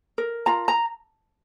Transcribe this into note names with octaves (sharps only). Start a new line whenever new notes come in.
A#4
F4 A#5
A#5